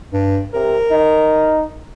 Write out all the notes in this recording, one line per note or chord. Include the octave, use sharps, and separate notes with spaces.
G2
C3 A#4
D#4